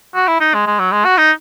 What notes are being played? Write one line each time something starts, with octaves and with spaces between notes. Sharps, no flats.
F#4
E4
D#4
G#3
G#3
F#3
G#3
F#4
D#4